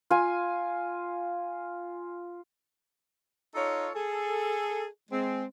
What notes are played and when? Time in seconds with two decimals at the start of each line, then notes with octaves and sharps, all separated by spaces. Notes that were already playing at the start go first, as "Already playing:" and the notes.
0.11 F4 G#5
3.55 D#4 F4 A4 C#5
3.95 G#4 A4
5.11 G#3 C4